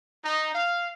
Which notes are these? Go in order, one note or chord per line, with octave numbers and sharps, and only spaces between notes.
D#4
F5